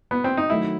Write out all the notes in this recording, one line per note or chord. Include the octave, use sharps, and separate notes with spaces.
B3
C4
D#4
D#3 F#3 A3 E4